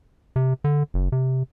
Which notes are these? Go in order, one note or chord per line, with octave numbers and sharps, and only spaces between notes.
C3
D3
F#1
C3